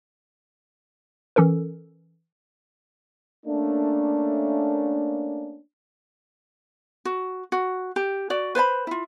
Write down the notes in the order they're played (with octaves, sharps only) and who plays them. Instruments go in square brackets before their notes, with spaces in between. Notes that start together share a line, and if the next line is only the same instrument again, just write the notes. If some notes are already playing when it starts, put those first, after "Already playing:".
[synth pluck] E3 C#4 A4 A#4
[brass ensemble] A3 A#3 C#4 D4
[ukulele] F#4
F#4
G4
F#4 D5
B4 C5 D5 B5
E4 F4